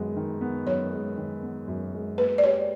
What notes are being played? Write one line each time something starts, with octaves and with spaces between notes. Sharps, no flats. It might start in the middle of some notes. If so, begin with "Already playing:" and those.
Already playing: F#2 D#3 G#3 B3
D#3
B3
F#2 C#5
G#3
D#3
B3
F#2
G#3
A#3 B4
D5
G4 C#5